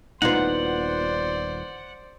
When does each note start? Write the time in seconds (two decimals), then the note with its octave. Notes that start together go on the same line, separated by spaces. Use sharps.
0.22 D#1 B3 D#4 F4 C5 D5 F#5